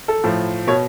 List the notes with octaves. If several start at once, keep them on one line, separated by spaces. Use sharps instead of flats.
A4
A2 F3
B2 C#5